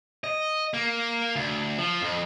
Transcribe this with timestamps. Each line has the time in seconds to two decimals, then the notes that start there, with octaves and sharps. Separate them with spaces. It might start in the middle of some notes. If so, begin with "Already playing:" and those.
0.24 D#5
0.74 A#3
1.36 D2
1.78 F3
2.02 F2